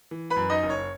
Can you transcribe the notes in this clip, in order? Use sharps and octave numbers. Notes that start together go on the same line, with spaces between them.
E3
B4 B5
F#2
D#4 D#5
F#1
C#5